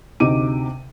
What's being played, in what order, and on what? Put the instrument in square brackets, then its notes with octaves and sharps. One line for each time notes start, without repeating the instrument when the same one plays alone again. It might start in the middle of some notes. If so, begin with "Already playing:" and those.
[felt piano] D2 C3 D#4 D6 D#7